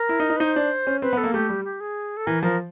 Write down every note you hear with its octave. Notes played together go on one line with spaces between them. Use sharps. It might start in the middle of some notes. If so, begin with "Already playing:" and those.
Already playing: A#4
E4
D#4
D#4
B4
D#4 C5
D4
C#4
C4 B4
B3
A4
A#3
A3 G4
G3
G4
G#4
A4
E3 A#4
F3 A#4